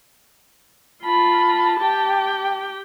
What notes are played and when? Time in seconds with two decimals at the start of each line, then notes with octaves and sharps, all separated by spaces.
1.04 F4 A5 B5
1.80 G4 G5